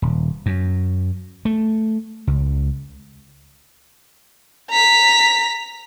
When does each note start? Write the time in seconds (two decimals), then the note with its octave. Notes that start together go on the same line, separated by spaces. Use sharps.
0.02 D#1
0.46 F#2
1.45 A3
2.27 C#2
4.70 A#5 B6